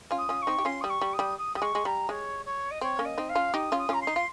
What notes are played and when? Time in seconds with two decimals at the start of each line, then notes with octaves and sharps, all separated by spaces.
0.11 C#4 F4
0.17 D#6
0.29 C#4 F4
0.42 C#6
0.47 C4 D#4
0.58 G4
0.65 C#4 F4 C6
0.81 G3 D#6
0.89 C#6
1.01 G3
1.13 D#6
1.19 G3
1.38 D#6
1.55 G3 D#6
1.62 G#3 C#6
1.75 G#3
1.85 G3 A#5
2.09 G#3 C#5
2.45 C#5
2.71 D#5
2.81 C4 C#5
2.99 A#3 C#4
3.05 D#5
3.18 C4 D#4
3.29 F5
3.35 C#4 F4
3.54 D#4 G4 D#6
3.72 C#4 F4
3.78 D#6
3.89 C#4 F4 A#5
4.01 C6
4.07 D#4
4.16 F4